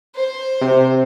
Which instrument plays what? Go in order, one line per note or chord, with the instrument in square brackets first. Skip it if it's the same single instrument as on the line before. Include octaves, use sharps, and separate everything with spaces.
[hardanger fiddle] C5
[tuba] C3